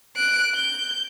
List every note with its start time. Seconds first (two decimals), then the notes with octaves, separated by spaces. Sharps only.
0.16 F#6 D7
0.55 G6